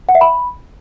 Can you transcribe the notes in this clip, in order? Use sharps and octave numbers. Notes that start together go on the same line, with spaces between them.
F#5
E5
B5